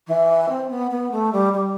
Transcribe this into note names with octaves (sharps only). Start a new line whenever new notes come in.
E3
C4
B3
B3
A3
G3
G3